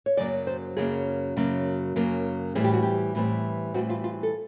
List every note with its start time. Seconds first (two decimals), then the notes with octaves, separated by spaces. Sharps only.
0.06 C#5
0.17 F#2 C#3 F#3 A#3 D5
0.47 C5
0.77 F#2 C#3 F#3 A#3 G#4
1.36 F#2 C#3 F#3 A#3
1.96 F#2 C#3 F#3 A#3
2.55 A2 E3 G3 C4 G#4
2.64 G4
2.73 F#4
2.83 G4
3.15 A2 E3 G3 C4
3.74 A2 E3 G3 C4 F#4
3.89 F4
4.04 F4
4.23 A4